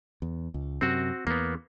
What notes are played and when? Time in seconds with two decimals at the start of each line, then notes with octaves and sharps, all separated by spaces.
0.22 E2
0.54 C#2
0.81 F#2 C3 C4 F#4
1.27 E2 A#3 B3